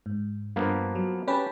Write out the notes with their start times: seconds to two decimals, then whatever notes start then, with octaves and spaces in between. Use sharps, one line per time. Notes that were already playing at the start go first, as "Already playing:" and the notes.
0.06 G#2
0.56 G2 F3 A#3 B3
0.95 F#3
1.28 C#4 G4 B4 A5